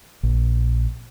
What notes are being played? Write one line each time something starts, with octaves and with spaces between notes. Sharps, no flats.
A#1